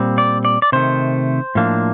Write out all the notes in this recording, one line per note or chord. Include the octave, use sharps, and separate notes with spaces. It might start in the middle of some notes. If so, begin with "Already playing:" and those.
Already playing: A#2 G3 C4
D5
D5
D5
C3 D#3 A3 C5
A2 F3 A#3 D4